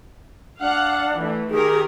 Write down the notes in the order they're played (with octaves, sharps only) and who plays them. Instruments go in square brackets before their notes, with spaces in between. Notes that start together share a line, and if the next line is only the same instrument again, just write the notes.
[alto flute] D4 [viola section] F5 F#5
[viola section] E3 A3
[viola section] D#3 G4 A#4 [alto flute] G#4